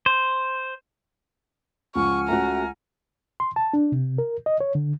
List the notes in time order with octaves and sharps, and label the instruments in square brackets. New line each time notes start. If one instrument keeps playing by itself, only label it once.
[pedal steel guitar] C5
[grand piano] C#2 F3 [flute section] F#5 G#5 F6 [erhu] C#6
[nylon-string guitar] A3 C#4 F#4 [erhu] A#5
[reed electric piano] C6
A5
D4
C3
A#4
D#5
C#5
D3